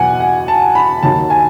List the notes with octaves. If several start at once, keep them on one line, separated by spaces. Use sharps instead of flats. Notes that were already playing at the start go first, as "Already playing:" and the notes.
Already playing: E2 B2 F#3 F#5 G#5
F#5
A5
B5
D#2 D#3 F#3 A5
G#5